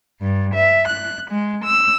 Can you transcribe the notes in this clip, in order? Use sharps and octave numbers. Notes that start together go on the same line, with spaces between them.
G2
E5
F#6
G#3
E6